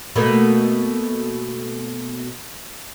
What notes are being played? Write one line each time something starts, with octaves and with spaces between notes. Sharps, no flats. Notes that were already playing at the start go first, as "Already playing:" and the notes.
B2 A3 A#3